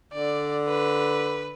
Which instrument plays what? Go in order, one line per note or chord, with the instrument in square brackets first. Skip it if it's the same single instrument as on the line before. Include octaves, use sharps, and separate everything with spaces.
[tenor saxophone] D3 [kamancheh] D5
[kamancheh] B4